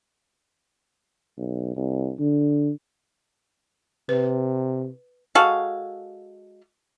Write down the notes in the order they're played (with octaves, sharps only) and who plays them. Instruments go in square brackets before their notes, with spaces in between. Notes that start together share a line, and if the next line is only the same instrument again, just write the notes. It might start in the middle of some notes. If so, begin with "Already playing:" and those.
[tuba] B1
C2
D3
[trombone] C3 [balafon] B4
[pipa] G#3 F#4 A4 F5